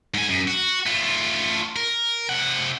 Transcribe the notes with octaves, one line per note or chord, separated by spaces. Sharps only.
G#2 G#5
F#2
F#4
A3 F4
A#4
C3 F#5